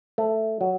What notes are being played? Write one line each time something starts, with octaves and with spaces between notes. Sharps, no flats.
A3
F#3